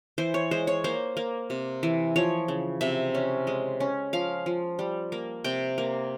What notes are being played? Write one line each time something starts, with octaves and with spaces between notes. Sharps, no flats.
E3 C5
C#5
G#3 C5
C#5
A#3 C5
A#3
C3
E3
F3 C#5
C#3
C3 E5
C#4
G#3
C#4
F3 F5
F3
G3
A#3
C3 G5
A#3